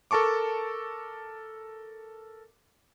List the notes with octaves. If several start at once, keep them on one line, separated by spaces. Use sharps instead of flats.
A4 A#4 A5 C#6 D6